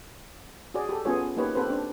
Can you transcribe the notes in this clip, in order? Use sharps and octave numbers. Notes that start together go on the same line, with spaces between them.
F#4 G#4 C#5 D5
G4 A4
B3 C#4 F4 G#4 C#5
A#3 D#4 G4 B4 C#5
C4 G4 A4 B4 C5
D4